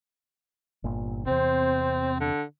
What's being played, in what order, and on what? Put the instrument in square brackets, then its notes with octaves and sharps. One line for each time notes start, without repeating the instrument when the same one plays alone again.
[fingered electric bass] G1 A#2
[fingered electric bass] E2 C3 [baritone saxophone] C4 [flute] C5
[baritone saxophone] D3